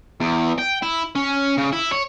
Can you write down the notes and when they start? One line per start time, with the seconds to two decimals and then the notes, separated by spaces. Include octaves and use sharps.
0.21 E2
0.58 G5
0.83 E4
1.16 C#4
1.58 C#3
1.72 E4
1.92 C#5